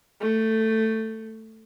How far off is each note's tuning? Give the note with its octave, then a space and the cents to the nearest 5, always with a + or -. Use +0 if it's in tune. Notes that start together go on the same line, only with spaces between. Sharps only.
A3 +10